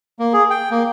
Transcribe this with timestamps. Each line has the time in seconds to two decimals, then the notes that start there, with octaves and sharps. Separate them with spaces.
0.19 A#3
0.33 G#4
0.50 G5
0.71 A#3